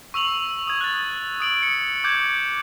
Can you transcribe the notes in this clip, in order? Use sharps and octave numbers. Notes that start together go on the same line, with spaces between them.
C#6 E6 F7 F#7
D#6 G#6
F#6 A6
D#6 D7 F#7
C#7
D6 G6 G#6